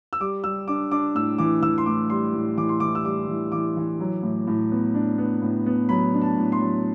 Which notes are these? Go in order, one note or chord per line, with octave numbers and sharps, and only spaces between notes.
E6
G3 D6
G3 E6
D4 D6
D4 D6
A2 E6
E3 D6
E3 E6
C6
A2 D6
G3 C6
A2
E3 D6
C6
E3 D6
E6
G3 D6
E3
E3 D6
E3
F#3
A2
A2
B3
D4
B3
A2
B3
F#3 B5
D4
A5
A2
C6
F#3